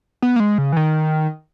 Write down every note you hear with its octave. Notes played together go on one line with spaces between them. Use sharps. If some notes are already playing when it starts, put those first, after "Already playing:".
B3
A#3
G#3
C#3
E3
D#3